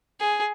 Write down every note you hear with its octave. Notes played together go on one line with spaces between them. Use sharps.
G#4